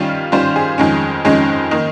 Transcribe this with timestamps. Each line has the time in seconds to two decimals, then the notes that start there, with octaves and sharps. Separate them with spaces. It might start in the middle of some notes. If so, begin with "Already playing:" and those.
Already playing: D#3 G3 C#4 F4
0.32 D#3 G3 C#4 F4 C5
0.56 G#4
0.78 F2 D#3 G#3 C#4
1.25 F2 D#3 G#3 C#4
1.71 D#3 A#3 D#4